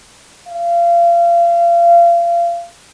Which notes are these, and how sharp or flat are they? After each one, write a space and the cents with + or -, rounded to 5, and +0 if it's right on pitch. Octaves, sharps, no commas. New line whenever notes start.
F5 -30